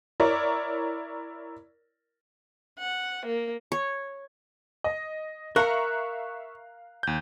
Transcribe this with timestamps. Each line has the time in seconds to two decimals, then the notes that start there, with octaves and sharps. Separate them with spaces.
0.20 E4 A#4 C#5 D5
2.79 F#5
3.26 A#3
3.72 C#5
4.84 D#5
5.56 A#4 E5 F5 A#5 C#6 F#6 C#7
7.03 D#2 G6